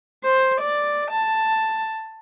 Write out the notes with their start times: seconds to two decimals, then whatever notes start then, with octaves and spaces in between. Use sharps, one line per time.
0.24 C5
0.61 D5
1.12 A5